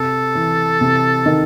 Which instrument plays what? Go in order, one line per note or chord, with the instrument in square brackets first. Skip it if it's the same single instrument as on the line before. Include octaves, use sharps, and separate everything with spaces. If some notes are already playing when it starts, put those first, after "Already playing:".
Already playing: [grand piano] C3 [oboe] A4
[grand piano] E3
C3
D#3